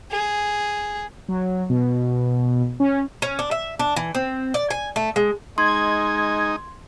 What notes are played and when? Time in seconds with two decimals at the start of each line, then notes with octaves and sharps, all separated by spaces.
0.11 G#4
1.29 F#3
1.70 B2
2.80 C#4
3.22 C#4
3.39 D4
3.51 E5
3.79 D4
3.96 E3
4.15 C4
4.54 D5
4.70 G#5
4.96 A3
5.16 G#3
5.58 G#3 D#4 C6 G#6